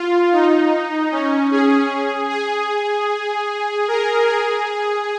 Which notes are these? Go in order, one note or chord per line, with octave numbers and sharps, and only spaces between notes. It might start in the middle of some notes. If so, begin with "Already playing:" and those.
Already playing: F4
D#4
C#4
G#4
G#4
A#4
G#4